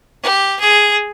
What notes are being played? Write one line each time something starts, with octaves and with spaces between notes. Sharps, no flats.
G4
G#4